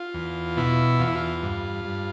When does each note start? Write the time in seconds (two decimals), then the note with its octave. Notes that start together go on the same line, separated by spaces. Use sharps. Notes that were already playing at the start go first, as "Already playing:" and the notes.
Already playing: F4
0.14 E2
0.57 B2 E4
0.99 E2 F4
1.08 E4
1.15 F4
1.42 G2
1.85 G2